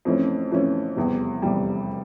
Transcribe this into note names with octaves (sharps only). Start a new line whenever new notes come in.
F2 E3 A3 C#4
F2 E3 A3 C#4
F1 E2 E3 G3
F1 E2 E3 G3